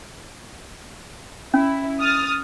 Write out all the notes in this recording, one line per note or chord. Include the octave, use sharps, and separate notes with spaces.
C#4 E4
D#6 F6 A6